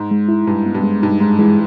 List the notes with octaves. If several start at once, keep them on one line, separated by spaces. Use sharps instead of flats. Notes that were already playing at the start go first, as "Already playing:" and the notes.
Already playing: G#2
G#3
E4
G2 G#3
B3
G2
G#3
G2 D#4
G#2 G#3
E3 G#3